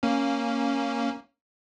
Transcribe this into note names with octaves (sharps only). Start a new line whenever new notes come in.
A#3 C#4